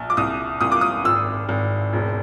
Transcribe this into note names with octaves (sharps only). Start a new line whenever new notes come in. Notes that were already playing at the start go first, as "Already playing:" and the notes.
Already playing: A#1
D6
C2 D#6
C2 D#6
D6
D#6
G#1 E6
G#1
E1